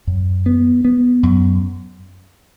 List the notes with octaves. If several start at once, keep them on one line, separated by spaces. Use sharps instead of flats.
F#2
B3
B3
F#2